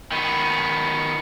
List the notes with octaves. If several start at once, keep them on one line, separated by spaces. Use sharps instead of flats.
D#3 B3